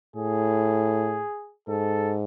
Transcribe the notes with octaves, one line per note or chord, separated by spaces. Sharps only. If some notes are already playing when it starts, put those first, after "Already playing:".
A2 G#4
G#2 A4